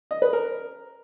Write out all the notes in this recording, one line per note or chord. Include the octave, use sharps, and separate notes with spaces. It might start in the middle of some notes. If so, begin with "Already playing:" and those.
D#5
B4
A#4